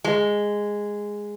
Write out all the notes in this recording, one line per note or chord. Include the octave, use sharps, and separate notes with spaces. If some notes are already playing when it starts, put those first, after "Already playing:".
G#3